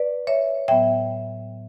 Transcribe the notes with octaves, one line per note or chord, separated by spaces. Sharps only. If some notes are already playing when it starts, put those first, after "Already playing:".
Already playing: B4 D5
C#5 E5
A2 F#3 B3 E5 G5